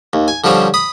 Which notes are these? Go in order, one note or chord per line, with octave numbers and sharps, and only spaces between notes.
D#2
G#5
D3 F3 G3 C4 C#4
B5 D#6